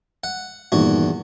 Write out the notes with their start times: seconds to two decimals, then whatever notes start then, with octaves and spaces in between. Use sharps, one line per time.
0.24 F#5
0.72 E2 G2 A#2 D#3 F#4